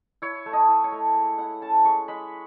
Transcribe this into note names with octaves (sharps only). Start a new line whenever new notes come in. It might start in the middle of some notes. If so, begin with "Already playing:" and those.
E4 C#5
A3
D#5
E4
C#5
A3
G#3
E4 F#5
C#4 A5
G#3 C#6
G#3 B5